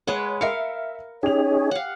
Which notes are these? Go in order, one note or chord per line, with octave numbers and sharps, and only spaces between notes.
G#3 B4 C#5 F#5
A#4 E5 F5 C#7
C#4 D#4 G4 G#4 C#5 F7
F5 F#5